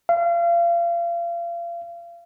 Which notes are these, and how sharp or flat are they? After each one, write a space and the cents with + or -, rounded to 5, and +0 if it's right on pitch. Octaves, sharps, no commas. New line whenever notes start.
F5 -35